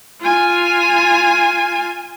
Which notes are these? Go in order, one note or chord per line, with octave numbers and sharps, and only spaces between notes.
F4 G#5